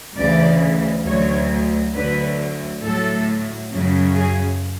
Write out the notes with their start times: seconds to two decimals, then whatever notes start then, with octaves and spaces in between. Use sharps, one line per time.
0.17 D2 C#3 E3 D5
1.05 D2 D3 F#3 C#5
1.94 D2 D3 F#3 B4
2.82 A2 F#3 A4
3.70 F#2 C#3 F#3
4.15 G#4